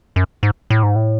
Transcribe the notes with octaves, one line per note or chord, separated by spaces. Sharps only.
F#2
G#2
A2
G#2
A2